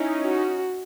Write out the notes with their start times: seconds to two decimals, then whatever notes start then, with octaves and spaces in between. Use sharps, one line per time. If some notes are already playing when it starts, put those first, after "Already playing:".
Already playing: C#4 D#4 E4
0.23 F#4